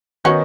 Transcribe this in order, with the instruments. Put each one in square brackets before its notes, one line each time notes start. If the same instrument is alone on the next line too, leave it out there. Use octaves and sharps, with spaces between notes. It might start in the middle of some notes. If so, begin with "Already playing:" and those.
[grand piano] D#3 B3 D#4 [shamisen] C#4 F#4